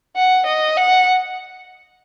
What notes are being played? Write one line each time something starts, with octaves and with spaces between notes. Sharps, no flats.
F#5
D#5
F#5